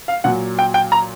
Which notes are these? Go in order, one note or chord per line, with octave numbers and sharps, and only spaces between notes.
F5
A#2 F#3 F#5
G5
G5
A#5